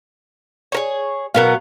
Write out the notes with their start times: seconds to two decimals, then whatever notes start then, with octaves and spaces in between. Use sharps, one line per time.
0.72 G#4 A#4 C#5
1.34 B2 F#3 B3 A#4 F5